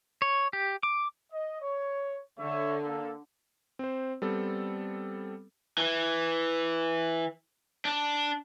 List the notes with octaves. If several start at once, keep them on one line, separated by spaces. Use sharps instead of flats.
C#5
G4
D6
D#5
C#5
D3 C#5 E5
A#3 A4
C4 C5
G3 B3 C4 A4
E3
D4